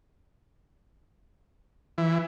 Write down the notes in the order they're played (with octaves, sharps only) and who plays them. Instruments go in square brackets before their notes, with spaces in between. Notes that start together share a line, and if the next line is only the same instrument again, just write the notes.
[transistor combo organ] E3